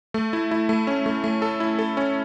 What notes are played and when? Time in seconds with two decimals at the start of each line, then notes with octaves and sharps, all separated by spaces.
0.14 A3
0.33 E4
0.51 E4
0.69 A3
0.87 C#4
1.06 A3
1.24 A3
1.42 A4
1.60 E4
1.79 A4
1.97 C#4